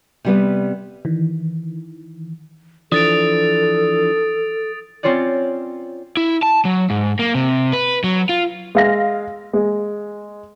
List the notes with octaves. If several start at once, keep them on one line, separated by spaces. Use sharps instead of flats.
C3 G3 B3
D#3 E3
E3 F3 D4 A4 D#6 A6 D7
C4 C#4 F4 C#5 D5
E4
A5
F#3
G#2
A#3
C3
B4
F#3
F4
G#3 F5 A#6
G#3